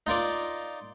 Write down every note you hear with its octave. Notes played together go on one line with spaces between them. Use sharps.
D#4 F4 A#4 D5